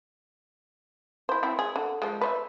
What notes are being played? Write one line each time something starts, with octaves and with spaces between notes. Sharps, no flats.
E4 C5
C4 E4
G#4
D3
F3 G#3
B4 C5 E5